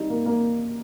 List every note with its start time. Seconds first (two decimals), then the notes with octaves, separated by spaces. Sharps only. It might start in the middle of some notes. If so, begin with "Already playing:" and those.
Already playing: G3 D#4
0.10 A#3
0.26 A#3